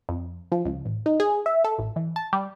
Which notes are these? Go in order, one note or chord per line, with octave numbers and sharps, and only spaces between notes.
F2
F3
C#2
A1
D#4
G#4
E5
A4
A1
E3
A5
G3